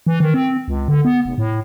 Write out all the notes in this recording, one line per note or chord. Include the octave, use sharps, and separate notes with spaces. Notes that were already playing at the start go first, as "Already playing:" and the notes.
E3
D#3
C4
C#2
D3
B3
F1
A2